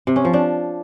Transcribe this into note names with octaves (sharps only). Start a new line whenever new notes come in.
C3
C#4
F3
D4